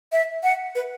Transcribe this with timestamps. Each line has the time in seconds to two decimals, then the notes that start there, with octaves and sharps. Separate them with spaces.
0.12 E5
0.43 F#5
0.75 B4